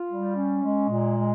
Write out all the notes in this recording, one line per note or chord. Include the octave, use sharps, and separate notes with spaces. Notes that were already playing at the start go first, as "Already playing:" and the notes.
Already playing: F4
G3
C#4
G#3
A#2
G#3